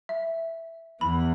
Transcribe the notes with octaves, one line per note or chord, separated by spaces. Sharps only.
E5
E2 E3 B5